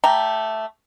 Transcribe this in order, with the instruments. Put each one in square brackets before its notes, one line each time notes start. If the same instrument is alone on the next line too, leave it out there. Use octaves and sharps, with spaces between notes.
[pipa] A3 G4 A#5